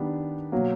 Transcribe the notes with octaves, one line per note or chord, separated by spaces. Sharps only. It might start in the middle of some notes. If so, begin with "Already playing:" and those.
Already playing: D#3 G3 B3 D4 G4
B2 F#3 A#3